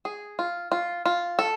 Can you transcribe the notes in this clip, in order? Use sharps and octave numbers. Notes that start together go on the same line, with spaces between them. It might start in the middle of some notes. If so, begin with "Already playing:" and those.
G#4
F4
F4
F4
A4